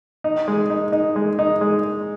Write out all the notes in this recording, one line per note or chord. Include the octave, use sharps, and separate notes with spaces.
D#4
G#3
D#4
D#4
G#3
D#4
G#3